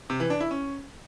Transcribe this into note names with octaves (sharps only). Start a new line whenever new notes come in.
C3
E3
D4
E4
C#4